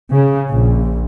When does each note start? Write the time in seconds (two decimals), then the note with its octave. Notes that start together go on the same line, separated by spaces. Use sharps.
0.12 C#3
0.50 A#1